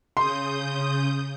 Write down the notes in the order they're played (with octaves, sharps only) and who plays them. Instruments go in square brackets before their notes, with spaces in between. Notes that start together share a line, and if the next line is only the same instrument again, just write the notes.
[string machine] C#3 D#6 G6 [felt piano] C6